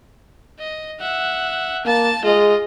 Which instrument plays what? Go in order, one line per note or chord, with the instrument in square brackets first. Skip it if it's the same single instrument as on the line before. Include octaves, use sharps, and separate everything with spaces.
[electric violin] D#5
E5 F#5
[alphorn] A#3 [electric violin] A5 A6
[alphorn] G#3 [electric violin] F4 D#5